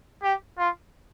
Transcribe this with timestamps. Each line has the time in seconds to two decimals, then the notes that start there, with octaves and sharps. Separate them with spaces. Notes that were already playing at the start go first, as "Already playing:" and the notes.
0.23 G4
0.58 F4